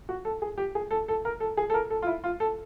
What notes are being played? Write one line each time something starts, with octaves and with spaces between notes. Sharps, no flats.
F#4
A4
G#4
G4
G#4
A4
A4
A#4
A4
G#4
A4
A#4
A4
F4
E4
F4
A4